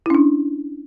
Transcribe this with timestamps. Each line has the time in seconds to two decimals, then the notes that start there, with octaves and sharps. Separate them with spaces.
0.06 E4
0.10 C#4
0.15 D4